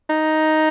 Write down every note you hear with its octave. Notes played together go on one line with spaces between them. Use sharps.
D#4